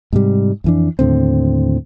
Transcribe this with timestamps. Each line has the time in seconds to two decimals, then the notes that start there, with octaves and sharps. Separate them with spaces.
0.13 G#2 C3 G3
0.64 F2 E3 D4
0.99 D#2 A2 D3 C4